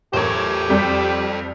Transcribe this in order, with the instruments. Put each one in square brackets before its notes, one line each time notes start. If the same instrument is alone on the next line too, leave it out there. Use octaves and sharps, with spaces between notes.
[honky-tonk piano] A1 A#4 C#5 [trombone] G4 [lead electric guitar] A4 C5
[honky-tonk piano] F2 G3 G5